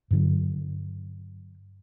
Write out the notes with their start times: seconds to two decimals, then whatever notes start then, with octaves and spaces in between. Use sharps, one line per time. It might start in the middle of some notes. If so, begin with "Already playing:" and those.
0.11 G2 D3 F#3